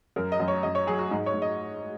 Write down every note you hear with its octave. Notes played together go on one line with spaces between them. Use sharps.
F#2 A#4
D#5
F#2
C#5
F#2 D#5
C#5
F#3 G#4
F#4
G#2 D#4
C#5
G#2
D#5